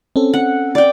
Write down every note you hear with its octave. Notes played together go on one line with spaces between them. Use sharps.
C4 C#4 A4
F#5
D5 G5